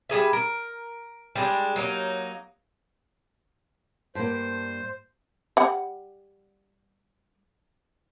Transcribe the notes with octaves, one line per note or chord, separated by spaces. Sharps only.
G3 G4 G#4 E5
A#4
G3 G#3 D4
F#3 A#3 D#4
G2 A#3 C5
G3 F#5